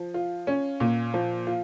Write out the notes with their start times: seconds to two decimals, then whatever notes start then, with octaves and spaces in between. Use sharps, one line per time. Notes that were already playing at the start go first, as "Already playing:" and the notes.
Already playing: F3
0.14 F4
0.47 C#4
0.80 A#2
1.14 F3
1.47 F4